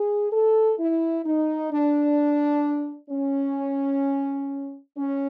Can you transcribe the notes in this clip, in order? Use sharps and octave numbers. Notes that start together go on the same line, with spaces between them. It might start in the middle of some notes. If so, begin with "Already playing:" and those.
Already playing: G#4
A4
E4
D#4
D4
C#4
C#4